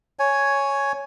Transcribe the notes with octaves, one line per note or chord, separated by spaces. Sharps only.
C#5 G#5